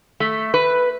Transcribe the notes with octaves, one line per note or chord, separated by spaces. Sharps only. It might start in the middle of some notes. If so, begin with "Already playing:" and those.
A3
B4